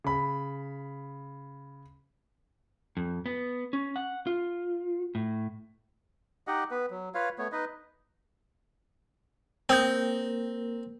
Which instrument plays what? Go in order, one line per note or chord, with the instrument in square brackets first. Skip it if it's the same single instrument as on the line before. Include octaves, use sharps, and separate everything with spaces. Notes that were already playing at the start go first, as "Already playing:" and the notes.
[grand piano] C#3 B5
[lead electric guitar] F2
B3
C#4
F#5
F4
A2
[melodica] D#4 G4 D#5 F#5
B3 B4
F#3
F4 B4 C#5 F5
A3 B3 C#5
D#4 B4 D#5
[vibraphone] A#3 A#4 [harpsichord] C4 [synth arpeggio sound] G5 D#6 G6